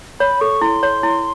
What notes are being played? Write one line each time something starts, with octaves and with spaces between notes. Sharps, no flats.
C#5 B5
A4 C#6
E4 C6
C#5
E4